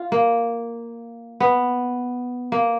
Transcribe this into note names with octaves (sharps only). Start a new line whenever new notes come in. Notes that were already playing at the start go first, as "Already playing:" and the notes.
Already playing: F4
A#3
B3
A#3